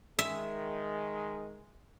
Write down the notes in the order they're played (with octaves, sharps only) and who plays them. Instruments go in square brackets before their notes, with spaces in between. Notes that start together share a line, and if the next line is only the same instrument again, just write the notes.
[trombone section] D#3 G#3 [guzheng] E5